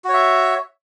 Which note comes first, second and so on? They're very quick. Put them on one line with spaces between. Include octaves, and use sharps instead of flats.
F#4 C#5 E5